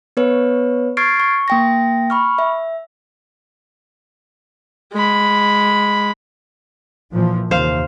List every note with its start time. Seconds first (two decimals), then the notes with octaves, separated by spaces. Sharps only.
0.17 B3 B4 C#5
0.97 C#6 F6 G#6 A6 C7 D7
1.20 C#6
1.48 A#3 G5 A#6
2.10 B5 C#6 F6
2.38 E5
4.93 G#3 B5
7.13 A#2 E3 F3
7.51 D#2 C3 C5 F5